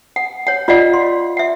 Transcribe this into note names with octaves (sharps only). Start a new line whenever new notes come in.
F#5
C#5 F#5
F4 D5 D#5 F5 F#5
C6
E5 F#5